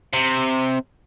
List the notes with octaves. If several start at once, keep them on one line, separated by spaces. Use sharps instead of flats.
C3